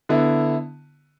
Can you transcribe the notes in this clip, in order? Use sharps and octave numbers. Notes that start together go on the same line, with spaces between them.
D3 B3 E4